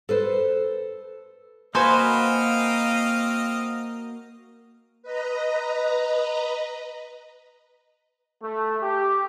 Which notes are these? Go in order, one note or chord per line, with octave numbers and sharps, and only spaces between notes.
A4 B4 C5
A#3 C4 F#4 B4 C5 D#5 F5 G#5
B4 D#5 A#5
A3
G4